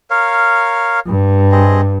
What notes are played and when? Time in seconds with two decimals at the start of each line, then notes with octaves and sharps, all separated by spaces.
0.10 A#4 C#5 F5
1.07 G2
1.52 C4 G#4 D#5